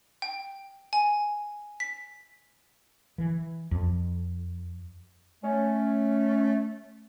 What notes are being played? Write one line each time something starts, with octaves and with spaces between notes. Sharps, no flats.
G5
G#5
B6
E3
F2
A3 C#4